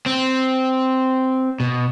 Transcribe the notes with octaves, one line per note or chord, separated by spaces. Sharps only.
C4
B2